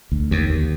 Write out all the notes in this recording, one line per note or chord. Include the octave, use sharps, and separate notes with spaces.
D2
D#2
D#2